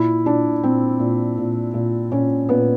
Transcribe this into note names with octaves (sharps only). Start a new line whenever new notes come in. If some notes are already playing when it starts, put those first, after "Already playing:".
Already playing: A#2 E4
A#2 D4
A#2 C4
A#2
A#2
A#2
A#2 C#4
A#2 B3